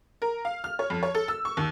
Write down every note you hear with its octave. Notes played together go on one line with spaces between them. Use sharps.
A#4
F5
F6
C#5
F2
C#5
A4
E6
C#6
D#2